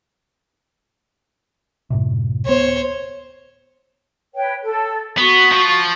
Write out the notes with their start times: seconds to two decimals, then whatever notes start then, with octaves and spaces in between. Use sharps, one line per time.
1.90 F#2 A2 C3
2.46 D1 B3 C5 C#5
4.34 B4 C#5 G5
4.63 A4
5.18 B3 F#4 C#6
5.52 F3